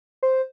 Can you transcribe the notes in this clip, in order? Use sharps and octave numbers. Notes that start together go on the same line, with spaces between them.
C5